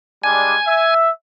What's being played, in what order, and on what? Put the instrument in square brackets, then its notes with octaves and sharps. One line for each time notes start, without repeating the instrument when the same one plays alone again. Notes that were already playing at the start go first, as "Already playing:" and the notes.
[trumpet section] G3 G#3 D4 [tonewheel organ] G#5
[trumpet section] E5